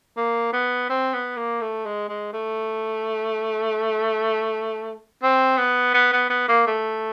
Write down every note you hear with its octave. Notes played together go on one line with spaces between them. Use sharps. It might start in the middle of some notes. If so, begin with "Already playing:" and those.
A#3
B3
C4
B3
A#3
A3
G#3
G#3
A3
C4
B3
B3
B3
B3
A#3
A3